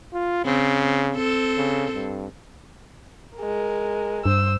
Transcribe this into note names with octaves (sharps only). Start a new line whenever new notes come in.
F4
C#3 C4
C4 A4
C#3
G2
G#3 A#4
G2 C5 E6